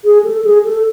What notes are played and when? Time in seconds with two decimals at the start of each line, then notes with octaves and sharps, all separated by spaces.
0.05 G#4
0.24 A4
0.45 G#4
0.65 A4